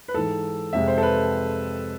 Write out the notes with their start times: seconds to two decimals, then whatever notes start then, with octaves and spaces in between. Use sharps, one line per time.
0.08 B4
0.14 G#2 E3 G#3 A4
0.73 F2 C3 G#3 E5
0.88 C5
0.98 A4
1.02 B4